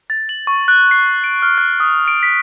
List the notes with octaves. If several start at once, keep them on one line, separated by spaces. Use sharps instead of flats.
A6
F#7
C#6
F#6
C7
D7
F6
F#6
D#6
D7
B6